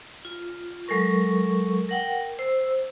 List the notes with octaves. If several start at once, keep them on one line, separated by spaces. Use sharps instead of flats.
F4
F#3 G#3 A4 A#4 C#6
A#4 F#5 G5
C5 E6